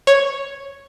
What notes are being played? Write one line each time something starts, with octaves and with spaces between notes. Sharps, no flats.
C#5